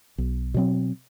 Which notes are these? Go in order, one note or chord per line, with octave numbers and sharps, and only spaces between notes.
B1
B2 F#3 C4